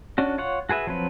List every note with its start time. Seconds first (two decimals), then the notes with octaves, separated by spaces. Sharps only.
0.18 C#4 D4 F#4
0.38 F4 C#5 F#5
0.69 F#4 G#4 B4 E5
0.87 F3 F#3 C4 B4